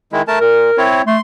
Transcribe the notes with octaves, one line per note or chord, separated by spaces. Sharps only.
D#3 G#3 E4
A3 A#4 A5
A#2 A#4
C4 E4 C#5
A3 C6